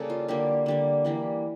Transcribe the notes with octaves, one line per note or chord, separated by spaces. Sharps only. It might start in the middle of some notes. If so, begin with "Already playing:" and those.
Already playing: C#3 G3 A#3 A4
F4
D3 G3 A#3 G4
D3 G3 A#3
E3 G3 A#3